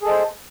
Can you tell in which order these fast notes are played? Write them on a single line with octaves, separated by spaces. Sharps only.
G#4 A4 D#5 C5